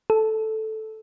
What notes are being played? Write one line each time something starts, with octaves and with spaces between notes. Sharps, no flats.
A4